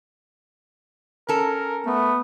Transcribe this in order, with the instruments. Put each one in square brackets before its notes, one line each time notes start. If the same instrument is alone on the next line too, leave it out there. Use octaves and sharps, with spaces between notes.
[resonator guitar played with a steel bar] C#4 A4 [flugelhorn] A#4
[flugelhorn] A3 [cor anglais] B3